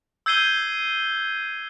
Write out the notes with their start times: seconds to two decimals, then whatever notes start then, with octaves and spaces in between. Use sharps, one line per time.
0.26 E6 G6 G#6 C7 D#7 G7